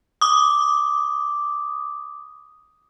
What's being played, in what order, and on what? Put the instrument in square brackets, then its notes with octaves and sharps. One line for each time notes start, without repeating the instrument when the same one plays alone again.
[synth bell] D6 D#6